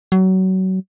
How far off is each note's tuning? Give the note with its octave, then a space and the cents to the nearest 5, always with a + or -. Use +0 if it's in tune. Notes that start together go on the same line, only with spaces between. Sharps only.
F#3 +25